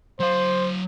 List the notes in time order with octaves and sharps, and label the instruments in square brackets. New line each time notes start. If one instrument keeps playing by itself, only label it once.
[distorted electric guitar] F#3 F5 [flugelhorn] C5